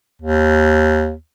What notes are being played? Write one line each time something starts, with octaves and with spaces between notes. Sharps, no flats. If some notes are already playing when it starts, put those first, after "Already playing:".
D#2